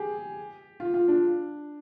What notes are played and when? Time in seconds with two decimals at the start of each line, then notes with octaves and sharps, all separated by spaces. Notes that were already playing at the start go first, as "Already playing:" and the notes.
Already playing: G4 G#4
0.80 F4
0.94 F4
1.08 D4